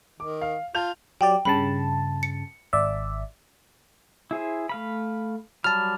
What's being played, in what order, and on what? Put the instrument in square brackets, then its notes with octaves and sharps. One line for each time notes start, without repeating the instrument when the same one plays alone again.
[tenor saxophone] D#3 [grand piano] D6
[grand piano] F5
[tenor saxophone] F4 [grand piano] A5 G6 F7
[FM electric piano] F#3 G4 D5 [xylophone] G5
[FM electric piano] G2 C#3 A5 [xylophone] B5
[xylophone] C#7
[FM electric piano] G#1 D5 E5
[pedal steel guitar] E4 G#4 C5
A3 F5 B5
[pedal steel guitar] F#3 G3 B5 [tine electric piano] A5 F6